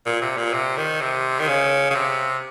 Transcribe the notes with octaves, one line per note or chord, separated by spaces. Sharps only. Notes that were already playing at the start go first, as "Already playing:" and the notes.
A#2
C3
A#2
C3
D#3
C3
D#3
C#3
C#3
C3